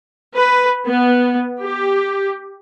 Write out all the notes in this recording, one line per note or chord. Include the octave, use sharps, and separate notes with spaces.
B4
B3
G4